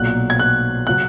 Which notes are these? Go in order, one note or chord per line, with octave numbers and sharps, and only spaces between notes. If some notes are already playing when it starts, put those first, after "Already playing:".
Already playing: B1 A#2 F#3 F#6
G#6
F#6
F#3 F#6